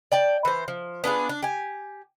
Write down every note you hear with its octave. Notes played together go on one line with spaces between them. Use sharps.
D5 G5 A5
E3 C5
F3
B3 D4 F4 G#4
D4
G4 G#5